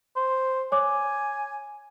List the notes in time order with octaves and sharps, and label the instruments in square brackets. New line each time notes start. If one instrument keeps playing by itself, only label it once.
[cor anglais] C5
[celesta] C#5 D6 [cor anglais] G#5